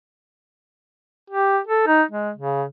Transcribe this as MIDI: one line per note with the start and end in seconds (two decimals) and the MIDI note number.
1.30 1.59 67
1.67 1.85 69
1.87 2.03 63
2.11 2.31 56
2.36 2.64 49